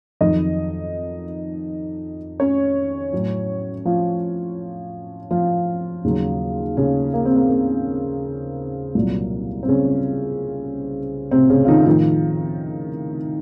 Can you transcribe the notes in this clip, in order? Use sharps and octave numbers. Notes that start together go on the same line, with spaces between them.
F2 D#3 F#3 D#4 D#5
C#4 C#5
A2 F#3
F3 F4
F3 F4
D#2 C#3 F#3
C#3 C#4
A#3
C4
A#3
A#3
C2 A#2 F#3
C4
C#3 C#4
C3 C4
C#3 C#4
F4
D#3 D#4
F4
A2 D#3 F3 D#4